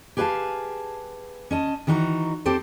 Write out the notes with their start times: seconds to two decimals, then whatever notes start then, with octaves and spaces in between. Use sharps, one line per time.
0.17 G4 G#4 B4 C#5 F5 A5
1.51 C#4 D#5 A5
1.87 D#3 E3 D#4 F#4 F5 A#5
2.46 C4 G4 A4 C5